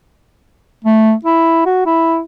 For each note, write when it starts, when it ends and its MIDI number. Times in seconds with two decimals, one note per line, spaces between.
0.85 1.13 57
1.25 1.63 64
1.66 1.82 66
1.86 2.21 64